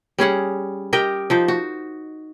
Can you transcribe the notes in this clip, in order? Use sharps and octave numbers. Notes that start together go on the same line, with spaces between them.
G3 C#4 G#4 F#5
G4 A#4 D#5 G5
F3 D#4 C5
F#4